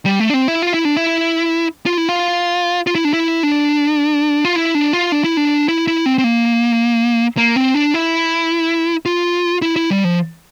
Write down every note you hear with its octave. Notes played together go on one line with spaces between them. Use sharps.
G3
A3
D4
C4
E4
F4
E4
D4
E4
F4
E4
F4
F4
E4
D4
E4
D4
F4
E4
D4
F4
D4
E4
D4
E4
E4
C4
C4
A#3
A#3
C4
D4
E4
F4
E4
E4
G3
F3